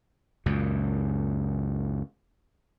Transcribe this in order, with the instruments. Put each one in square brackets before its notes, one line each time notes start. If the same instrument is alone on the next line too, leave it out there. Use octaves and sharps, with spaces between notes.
[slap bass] C#2 F#2 A#2